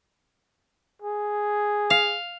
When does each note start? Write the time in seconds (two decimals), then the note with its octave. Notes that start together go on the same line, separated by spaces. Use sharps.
1.02 G#4
1.90 F5